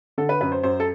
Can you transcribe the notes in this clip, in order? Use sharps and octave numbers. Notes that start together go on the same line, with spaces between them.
D3 A4
B4
F#2 B4
C5
F#2 C5
A4